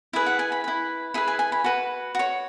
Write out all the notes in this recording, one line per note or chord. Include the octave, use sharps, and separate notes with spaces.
E4 G#4 B4
F#5
G#5
B5
E4 B4
E4 G#4 B4 B5
G#5
G#5
B5
F#4 B4
F#4 C#5